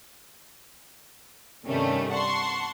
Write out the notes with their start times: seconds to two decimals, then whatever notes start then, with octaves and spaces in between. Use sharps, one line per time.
1.65 G2 C3 D#3 G3 A3 C#4
2.11 F#5 A5 C6 C#6